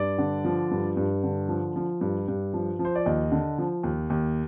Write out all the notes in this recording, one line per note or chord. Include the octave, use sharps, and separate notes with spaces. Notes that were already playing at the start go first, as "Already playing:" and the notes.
Already playing: G2 D5
D3
F3
G2
G2
D3
F3
F3
G2
G2
F3
F3
C5
D5
D#2 D#5
D3
F3
D#2
D#2